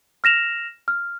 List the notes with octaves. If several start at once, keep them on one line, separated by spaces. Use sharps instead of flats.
F6 A#6 E7 F7
F6